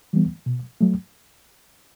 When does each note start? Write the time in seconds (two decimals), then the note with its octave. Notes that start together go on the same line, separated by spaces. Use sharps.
0.13 E3 G3 B3
0.46 B2
0.81 F#3 A3